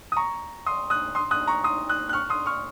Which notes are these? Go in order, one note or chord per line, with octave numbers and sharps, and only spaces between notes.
D#6
A#5 C#6
C6 D#6
D#6 F#6
C6 D#6
D#6 F#6
A#5 C#6
C6 D#6
D#6 F#6
F#6
C#6 F6
C6 D#6
C#6 F6